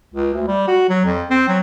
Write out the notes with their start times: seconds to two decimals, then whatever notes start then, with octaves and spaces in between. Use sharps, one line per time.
0.14 C#2
0.33 D2
0.48 G3
0.68 F#4
0.89 F#3
1.05 F2
1.30 C4
1.48 F#3